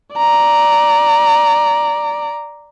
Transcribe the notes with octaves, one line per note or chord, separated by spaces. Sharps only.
D5 A#5